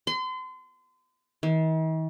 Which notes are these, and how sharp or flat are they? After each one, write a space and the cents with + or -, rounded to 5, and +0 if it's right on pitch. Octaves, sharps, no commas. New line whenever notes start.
C6 -35
D#3 +45